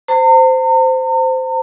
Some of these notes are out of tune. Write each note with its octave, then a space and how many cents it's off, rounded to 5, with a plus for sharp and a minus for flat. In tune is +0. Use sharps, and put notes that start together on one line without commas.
C5 -15 A#5 -45